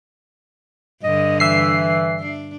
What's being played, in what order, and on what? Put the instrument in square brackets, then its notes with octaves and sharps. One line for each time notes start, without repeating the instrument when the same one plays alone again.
[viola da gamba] G2 D3 [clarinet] D#5
[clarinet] E3 [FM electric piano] E5 C7
[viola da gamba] D4